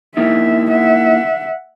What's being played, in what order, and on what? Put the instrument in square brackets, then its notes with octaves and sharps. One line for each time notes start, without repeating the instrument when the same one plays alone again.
[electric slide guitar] A#3 D#4 E4 [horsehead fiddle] E5
[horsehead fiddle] E5 F#5